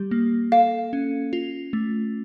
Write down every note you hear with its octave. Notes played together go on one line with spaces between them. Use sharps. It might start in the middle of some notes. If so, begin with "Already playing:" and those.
Already playing: G3 G4
A#3
A4 F5
C#4
F4
A3